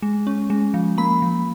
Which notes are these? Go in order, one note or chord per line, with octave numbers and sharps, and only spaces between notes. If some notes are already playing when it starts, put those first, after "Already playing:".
G#3
C#4
G#3
F3
A#3 B5
F3